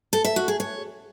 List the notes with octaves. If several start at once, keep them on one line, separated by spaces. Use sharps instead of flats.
A4
E5
F#4
G#4
C#5